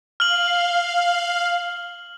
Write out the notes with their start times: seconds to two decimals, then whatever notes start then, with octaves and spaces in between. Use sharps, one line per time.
0.20 F5 F6 F#7